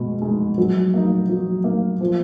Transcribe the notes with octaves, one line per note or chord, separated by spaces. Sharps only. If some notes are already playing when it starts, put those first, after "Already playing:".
Already playing: B2 G#3
G#3 D#4
F#3
A#3 D#4
F#3
A#3 D#4
F3